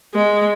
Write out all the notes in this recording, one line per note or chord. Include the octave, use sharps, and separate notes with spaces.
G#3